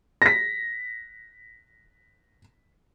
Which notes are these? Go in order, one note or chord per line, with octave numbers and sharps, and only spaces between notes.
A#6 B6